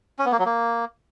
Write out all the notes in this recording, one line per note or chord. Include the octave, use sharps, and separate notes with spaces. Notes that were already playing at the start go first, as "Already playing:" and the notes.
C#4
B3
A#3
F#3
A#3